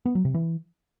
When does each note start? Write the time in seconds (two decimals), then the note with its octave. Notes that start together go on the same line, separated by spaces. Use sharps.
0.06 B3
0.15 F#3
0.25 C3
0.34 E3